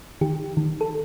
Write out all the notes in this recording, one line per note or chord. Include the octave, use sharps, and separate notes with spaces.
D#3 G4
D#3
A4